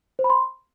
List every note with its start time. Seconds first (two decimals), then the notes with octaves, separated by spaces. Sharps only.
0.19 C5
0.24 B5
0.30 C6